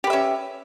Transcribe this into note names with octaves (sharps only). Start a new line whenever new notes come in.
C#4 G4 B4 E5